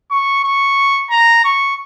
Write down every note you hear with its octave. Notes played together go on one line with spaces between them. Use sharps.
C#6
C#6
A#5
C#6